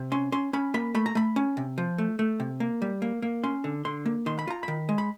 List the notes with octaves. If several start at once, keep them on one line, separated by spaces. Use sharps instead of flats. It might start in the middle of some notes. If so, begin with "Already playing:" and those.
Already playing: C3
C#4 C6
C#4 C6
C#4 B5
A#3 B5
A3 B5
A#5
A3 B5
C#4
C3
F3
A3
A3
C3
A#3
G3
A#3
A#3
C#4 C6
D3
D3 C6
A#3
D#3 C6
B5
F4 A#5
D#3 B5
G#3
B5